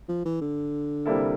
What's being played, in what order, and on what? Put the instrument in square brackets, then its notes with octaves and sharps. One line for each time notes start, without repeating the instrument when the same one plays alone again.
[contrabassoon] F3
E3
D3
[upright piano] C3 G3 A#3 E4 A4